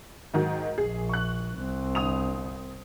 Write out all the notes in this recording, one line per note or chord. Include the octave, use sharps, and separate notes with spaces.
G#2 D#3 F#3
A#1 G#4
C#6 F#6
C2 C4
G1 D#6 F7